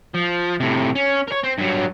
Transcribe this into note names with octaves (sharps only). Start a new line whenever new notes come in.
F3
A2 C3
C#4
A#4 C#5
C4
G2 F#3